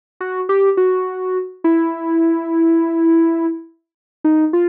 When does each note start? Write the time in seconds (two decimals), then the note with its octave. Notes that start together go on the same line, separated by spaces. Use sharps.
0.20 F#4
0.49 G4
0.77 F#4
1.64 E4
4.24 D#4
4.53 F4